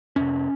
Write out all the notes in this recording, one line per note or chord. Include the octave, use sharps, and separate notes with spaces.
F2 C3 C#4